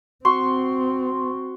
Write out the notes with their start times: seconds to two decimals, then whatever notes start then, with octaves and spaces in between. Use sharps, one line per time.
0.25 C4 F#4 C6 C#6